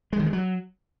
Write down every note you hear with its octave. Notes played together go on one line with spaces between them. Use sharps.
G#3
D#3
G#3
F#3